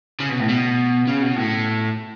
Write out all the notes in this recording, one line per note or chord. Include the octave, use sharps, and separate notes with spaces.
C#3
B2
A2
B2
C#3
B2
A2